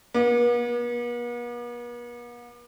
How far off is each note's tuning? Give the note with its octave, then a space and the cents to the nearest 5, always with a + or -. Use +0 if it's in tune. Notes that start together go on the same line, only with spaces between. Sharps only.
B3 -45